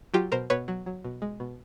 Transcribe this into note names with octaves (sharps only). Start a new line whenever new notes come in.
F#3 F4 G4
B2 A#4 C5
B2 B4 C#5
F#3
F#3
B2
G#3
B2